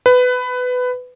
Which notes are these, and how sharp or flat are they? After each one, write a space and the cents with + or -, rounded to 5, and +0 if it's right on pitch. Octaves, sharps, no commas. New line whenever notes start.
B4 +15